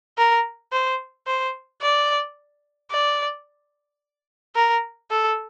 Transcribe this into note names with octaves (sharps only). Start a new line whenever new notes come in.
A#4
C5
C5
D5
D5
A#4
A4